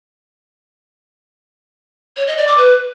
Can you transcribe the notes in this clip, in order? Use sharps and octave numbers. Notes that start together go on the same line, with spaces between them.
C#5
D#5
D5
D6
B4